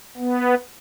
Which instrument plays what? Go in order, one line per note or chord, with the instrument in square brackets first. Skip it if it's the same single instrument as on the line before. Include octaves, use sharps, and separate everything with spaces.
[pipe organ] B3